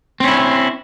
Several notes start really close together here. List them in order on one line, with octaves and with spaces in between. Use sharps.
C4 C#4 E4